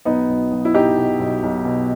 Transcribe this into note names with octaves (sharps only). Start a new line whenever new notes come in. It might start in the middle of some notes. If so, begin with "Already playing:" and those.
B1 B3 D#4
B1
B1
E4
B1 D#4 G4
B2
B1
B1
B2